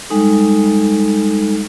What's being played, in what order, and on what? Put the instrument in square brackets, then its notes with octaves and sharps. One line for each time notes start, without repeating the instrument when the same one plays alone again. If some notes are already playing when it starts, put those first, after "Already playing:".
[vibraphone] G3 G#3 D#4 A4